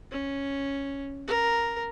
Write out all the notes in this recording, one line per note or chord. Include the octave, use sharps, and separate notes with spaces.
C#4
A#4